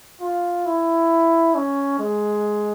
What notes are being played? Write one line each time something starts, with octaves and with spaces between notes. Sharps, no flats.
F4
E4
C#4
G#3